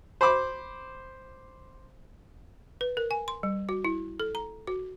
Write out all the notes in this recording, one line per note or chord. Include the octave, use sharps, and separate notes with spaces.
C5 B5 D6
B4
A#4
G#5
C6
G3
F#4
E4
A4
A#5
F#4